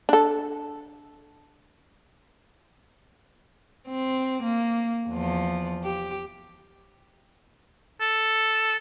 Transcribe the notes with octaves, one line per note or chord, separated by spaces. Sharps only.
D4 A4
C4
A#3
E2 F3
G4
A4